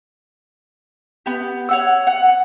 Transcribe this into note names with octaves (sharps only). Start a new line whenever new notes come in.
B3 G4
C#5 F#5 E6
F#5